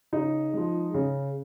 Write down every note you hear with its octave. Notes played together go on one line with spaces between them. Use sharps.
C#3 D#4
F3 G#3
C#3